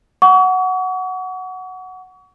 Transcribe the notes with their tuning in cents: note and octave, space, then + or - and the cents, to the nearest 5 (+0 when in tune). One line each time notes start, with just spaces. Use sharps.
F#5 +0 C#6 +35